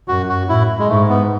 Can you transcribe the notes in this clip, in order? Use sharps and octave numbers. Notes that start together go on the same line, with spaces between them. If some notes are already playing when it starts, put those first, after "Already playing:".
F#2 F#4
F#4
A2 E4
G#3
G#2 A3
B3